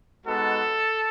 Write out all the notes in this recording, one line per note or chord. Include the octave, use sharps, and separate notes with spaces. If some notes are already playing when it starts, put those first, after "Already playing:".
G#3 B3 D#4 F#4 A4